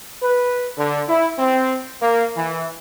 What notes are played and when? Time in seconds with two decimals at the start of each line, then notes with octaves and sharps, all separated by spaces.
0.22 B4
0.77 D3
1.08 E4
1.39 C4
2.01 A#3
2.36 E3